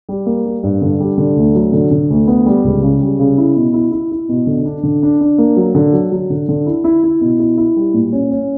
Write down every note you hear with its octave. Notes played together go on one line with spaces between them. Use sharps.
G3
A#3
G3
G2
D3
G3
D3
D2
F#3
D3
D3
D2
B3
G3
C#2
C#3
G3
C#3
E4
B2
E4
E4
E4
B2
D3
D4
D3
D4
D4
A#3
F#3
D3
F#3
F#3
D3
D3
E4
E4
E4
B2
E4
E4
G3
A#2
C#4
C#4